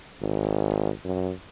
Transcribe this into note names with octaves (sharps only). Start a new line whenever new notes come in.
G#1
F#2